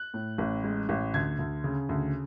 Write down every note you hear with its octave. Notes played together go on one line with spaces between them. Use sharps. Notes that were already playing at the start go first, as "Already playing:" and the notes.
Already playing: F#6
A2
A1
G#3
A1
D2 G#6
D2
C#3
D2